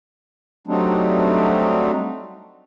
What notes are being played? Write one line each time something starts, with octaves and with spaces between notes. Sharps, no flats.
F#3 G3 A3 C4 D4 D#4